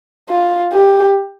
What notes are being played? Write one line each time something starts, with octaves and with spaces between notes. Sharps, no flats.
F4
G4